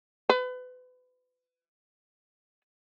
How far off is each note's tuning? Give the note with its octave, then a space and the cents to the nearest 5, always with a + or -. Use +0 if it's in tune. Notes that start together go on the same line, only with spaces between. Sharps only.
B4 +30